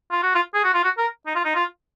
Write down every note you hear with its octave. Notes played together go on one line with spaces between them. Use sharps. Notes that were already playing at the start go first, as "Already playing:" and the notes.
F4
F#4
F4
G#4
F#4
F4
F#4
A#4
D#4
F4
D#4
F4